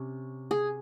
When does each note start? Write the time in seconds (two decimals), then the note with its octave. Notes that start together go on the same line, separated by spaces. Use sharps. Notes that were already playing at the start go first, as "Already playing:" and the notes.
Already playing: C3 C#4
0.51 G#4